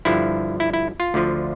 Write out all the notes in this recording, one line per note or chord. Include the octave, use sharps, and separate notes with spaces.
G2 D3 F3 E4
E4
E4
F4
D2 D3 F3